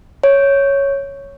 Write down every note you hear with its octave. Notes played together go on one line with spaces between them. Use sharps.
C#5